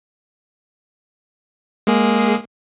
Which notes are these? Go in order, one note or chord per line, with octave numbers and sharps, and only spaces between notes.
G#3 A#3 G#4